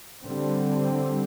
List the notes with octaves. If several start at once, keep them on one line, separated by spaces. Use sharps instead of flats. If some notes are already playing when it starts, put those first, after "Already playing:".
D3 G3 C4